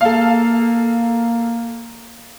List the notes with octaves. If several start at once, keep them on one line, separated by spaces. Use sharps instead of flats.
A#3 A4 F5